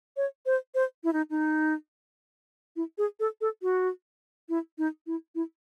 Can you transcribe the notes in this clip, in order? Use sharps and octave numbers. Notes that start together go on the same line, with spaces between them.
C#5
C5
C5
E4
D#4
D#4
E4
G#4
A4
A4
F#4
E4
D#4
E4
E4